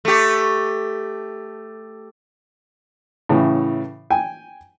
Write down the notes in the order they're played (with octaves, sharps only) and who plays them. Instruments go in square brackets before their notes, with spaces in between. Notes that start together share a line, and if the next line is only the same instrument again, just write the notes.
[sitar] A3 G4
[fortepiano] A2 C#3 E3
G5 G#5